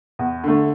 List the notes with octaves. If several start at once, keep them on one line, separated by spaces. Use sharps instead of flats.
E2
D3 A3